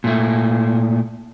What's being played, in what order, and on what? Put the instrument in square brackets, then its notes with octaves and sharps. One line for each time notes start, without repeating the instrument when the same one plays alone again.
[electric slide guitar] A#2 A3